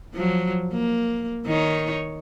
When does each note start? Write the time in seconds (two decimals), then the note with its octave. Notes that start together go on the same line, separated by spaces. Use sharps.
0.14 F3 F#3
0.73 A#3
1.45 D#3 D#4 C#5